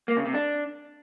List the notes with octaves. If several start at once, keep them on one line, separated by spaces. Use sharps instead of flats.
A#3
C#3
C3
D4